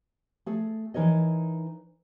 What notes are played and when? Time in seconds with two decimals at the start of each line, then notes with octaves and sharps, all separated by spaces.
0.46 A3 G#4 A4
0.94 E3 D#4 A#4 C#5 D#5